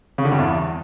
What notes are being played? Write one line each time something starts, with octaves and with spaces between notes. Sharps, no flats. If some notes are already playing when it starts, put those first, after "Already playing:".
C#3
D3
G2
E2